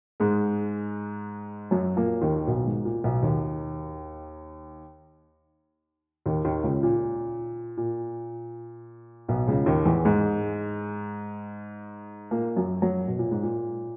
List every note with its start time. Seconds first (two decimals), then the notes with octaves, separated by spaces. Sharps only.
0.20 G#2 G#3
1.71 F#2 F#3
1.96 A#2 A#3
2.21 D#2 D#3
2.47 B1 B2
2.66 G#2
2.85 A#2
3.04 B1 B2
3.22 D#2 D#3
6.26 D#2 D#3
6.45 D#2 D#3
6.64 C#2 C#3
6.83 A#2
7.77 A#2
9.28 B1 B2
9.48 C#2 C#3
9.66 D#2 D#3
9.85 E2 E3
10.05 G#2 G#3
12.31 A#2 A#3
12.57 F#2 F#3
12.82 F#2 F#3
13.08 B2
13.19 A#2
13.31 G#2
13.43 A#2